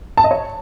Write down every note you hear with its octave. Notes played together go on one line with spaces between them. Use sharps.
A5
D#5
C#5